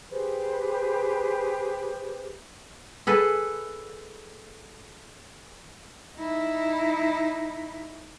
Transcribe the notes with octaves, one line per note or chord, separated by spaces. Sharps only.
G4 G#4 B4 C5
G#4 A4 B4
D#4 E4